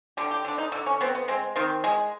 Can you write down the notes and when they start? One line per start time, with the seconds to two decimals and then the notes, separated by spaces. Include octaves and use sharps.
0.17 D3 G4
0.31 G4
0.45 D3 D4
0.58 D#4
0.72 D3
0.86 C#4
1.01 B3 C4
1.15 B3
1.28 G#3 C4
1.56 D#3 C4
1.84 G#3